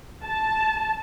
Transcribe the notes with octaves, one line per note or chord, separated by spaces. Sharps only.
A5